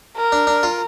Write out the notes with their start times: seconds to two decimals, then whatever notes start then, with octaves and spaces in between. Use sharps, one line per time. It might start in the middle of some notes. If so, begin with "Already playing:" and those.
0.17 A#4
0.32 D4
0.47 D4
0.63 F4